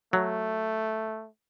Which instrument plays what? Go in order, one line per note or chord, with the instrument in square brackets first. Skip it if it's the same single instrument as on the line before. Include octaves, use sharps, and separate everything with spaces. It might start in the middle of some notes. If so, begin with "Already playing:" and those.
[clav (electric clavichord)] F#3 [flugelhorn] A3